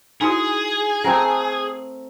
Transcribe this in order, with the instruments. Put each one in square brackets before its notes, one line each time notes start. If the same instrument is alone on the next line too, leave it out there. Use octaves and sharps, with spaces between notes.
[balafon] D#4 E4 F#4 [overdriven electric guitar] G#4
[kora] A3 C4 A#4